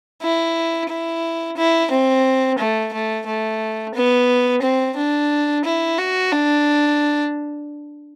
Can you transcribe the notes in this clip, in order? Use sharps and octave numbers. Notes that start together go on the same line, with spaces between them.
E4
E4
E4
C4
A3
A3
A3
B3
C4
D4
E4
F#4
D4